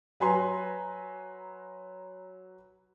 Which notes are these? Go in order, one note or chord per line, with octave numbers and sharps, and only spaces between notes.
F#3 B4 G#5 A#5 C6